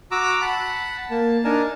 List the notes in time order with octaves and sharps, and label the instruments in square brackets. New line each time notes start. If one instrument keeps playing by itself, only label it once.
[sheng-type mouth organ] F#4 A#5 D6 E6
F#5 A5 B5
A#3 A5
D4 D#4 A#4 G#5 A5